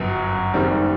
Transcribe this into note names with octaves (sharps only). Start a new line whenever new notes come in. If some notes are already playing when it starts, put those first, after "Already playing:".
Already playing: G1 F#2 F#3
F#1 F#2 D#3 G3 C4